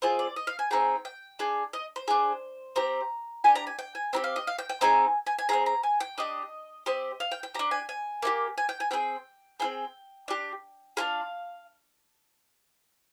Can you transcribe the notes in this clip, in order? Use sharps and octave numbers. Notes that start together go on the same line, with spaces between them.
C4 F4 G#4 D#5
D5
D#5
F5
G#5
C4 D#4 G#4 G5
G5
D4 G#4
D#5
C5
D4 G#4
C4 G4 A#5
D4 G4 G#5
A#5
G#5
G5
G#5
C4 D#4 G4 G5
F5
D#5
F5
G5
G5
C4 D#4 G#4 G#5
G#5
G#5
C4 F4 G#4 A#5
A#5
G#5
G5
D4 G4 D#5
C4 G4 D#5
F5
G5
G5
D4 G4 A#5
G#5
G#5
A#3 D#4 G4
G#5
G5
G#5
C4 F4 G#4 G5
C4 F4 G#4 G5
D4 G4
D4 F4 G#4 F5